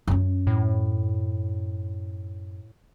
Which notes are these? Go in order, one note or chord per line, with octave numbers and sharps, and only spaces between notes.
F#2 C#4
A2